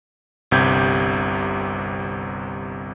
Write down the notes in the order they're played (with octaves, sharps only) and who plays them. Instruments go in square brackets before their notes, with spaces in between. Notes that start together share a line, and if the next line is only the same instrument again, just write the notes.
[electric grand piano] G1 C2 C3 G4 G6 G#6